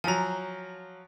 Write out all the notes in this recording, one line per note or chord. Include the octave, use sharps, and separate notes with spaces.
F3 F#3 G#5 A#5